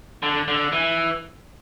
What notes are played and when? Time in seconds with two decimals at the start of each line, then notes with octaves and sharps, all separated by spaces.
0.23 D3
0.48 D3
0.73 E3